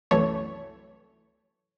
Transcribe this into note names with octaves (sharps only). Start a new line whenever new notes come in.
C2 F#2 E3 A3 C#5